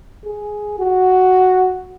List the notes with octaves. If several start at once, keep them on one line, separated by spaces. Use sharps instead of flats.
G#4
F#4